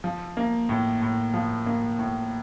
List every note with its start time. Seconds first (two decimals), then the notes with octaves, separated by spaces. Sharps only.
0.04 F3
0.37 A#3
0.69 A2
1.02 A2
1.34 F3
1.66 A#3
1.99 A2